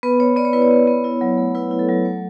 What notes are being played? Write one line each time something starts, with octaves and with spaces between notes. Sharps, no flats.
B3 B4
B3 C#5
B3 D5
C#5
E4 B4
C#5
B3
B3
E4
F#3
A3
E4 B4
E4
A4
F#3
A3